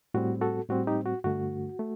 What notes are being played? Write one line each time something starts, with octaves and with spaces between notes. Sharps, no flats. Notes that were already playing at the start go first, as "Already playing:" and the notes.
A2 G3 C4 F#4
F#4 A4
A2 G3 C4 F#4
D#4 G4
F#4
G2 D3 A3 F#4
A3